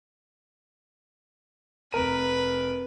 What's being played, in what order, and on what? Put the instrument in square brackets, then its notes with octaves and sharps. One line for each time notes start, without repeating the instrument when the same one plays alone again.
[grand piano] F1 A#4 D#7 [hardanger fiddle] B4